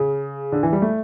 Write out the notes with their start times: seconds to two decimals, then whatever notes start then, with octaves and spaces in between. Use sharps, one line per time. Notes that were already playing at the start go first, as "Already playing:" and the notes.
Already playing: C#3
0.52 D3
0.63 E3
0.73 G3
0.82 A3